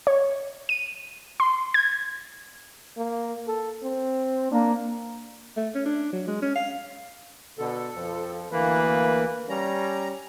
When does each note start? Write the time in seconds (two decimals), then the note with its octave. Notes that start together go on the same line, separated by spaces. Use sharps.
0.07 C#5
0.69 D#7
1.40 C6
1.74 G#6
2.97 A#3
3.47 A4
3.83 C4
4.51 A#3 D4
5.56 A3
5.75 C#4
5.86 D4
6.13 F#3
6.28 G#3
6.42 C#4
6.55 F5
7.58 B2 D3 A4
7.95 F2 F3
8.52 D2 E3 A#3 B4
9.49 G3 C#4 A#5